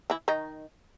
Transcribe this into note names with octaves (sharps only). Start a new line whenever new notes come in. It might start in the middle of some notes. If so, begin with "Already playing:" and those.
E3 E4
D#3 D#4